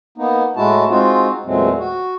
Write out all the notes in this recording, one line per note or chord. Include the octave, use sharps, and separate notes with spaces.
A#3 B3 D#4
A2 G#3 E4 F#4 A5
G#3 C4 D#4 F4 F#4
E2 A#2 F#3 G#3 A3 C4
F#4